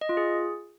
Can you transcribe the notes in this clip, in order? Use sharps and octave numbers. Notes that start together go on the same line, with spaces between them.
D#5
F4
G#4